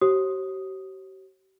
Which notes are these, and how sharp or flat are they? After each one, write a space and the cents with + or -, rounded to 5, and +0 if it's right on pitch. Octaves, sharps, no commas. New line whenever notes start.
G4 -45 C#5 -45 D#6 +0